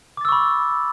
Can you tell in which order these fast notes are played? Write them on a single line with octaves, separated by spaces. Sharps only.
D6 A6 E6 C#6 B5